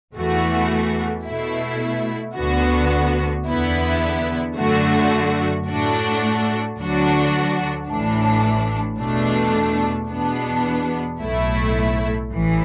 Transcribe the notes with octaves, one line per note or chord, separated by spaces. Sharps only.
E2 E3 A3 F#4
B2 A3 E4
D2 D3 B3 F#4
E2 D3 B3 E4
F#2 D3 A3 F#4
A2 A3 D4 F#4
D2 D3 F#3 D4 F#4
A1 A2 E3 D4
E2 B2 A3 D4
E2 B2 B3 D4
B1 A2 A3 E4
A1 A2 E3